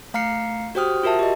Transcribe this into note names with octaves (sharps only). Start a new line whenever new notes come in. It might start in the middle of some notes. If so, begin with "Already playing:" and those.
A3 F5 A#5 F6 C7 C#7
F#4 G4 C5 G5 D#6 F6
F4 F#4 A#4 E5 A5
G4 D#5